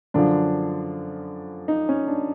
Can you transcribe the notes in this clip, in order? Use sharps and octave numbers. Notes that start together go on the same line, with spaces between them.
F#2 D3 F3 D4
D#4
C#4
D4